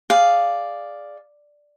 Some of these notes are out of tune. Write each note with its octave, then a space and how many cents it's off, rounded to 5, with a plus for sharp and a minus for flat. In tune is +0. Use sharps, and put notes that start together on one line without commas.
G#4 +0 D5 +0 F5 +0